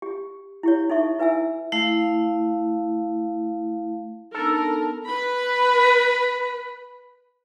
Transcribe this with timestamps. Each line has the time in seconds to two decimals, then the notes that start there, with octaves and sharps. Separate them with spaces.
0.02 G4
0.63 E4 G4 C#5
0.90 D#4 A4 E5 C#6
1.18 E4 B4 E5 G#5 E6
1.72 A3 E4 F5
4.35 B3 D4 D#4 A4 A#4
5.06 B4 B5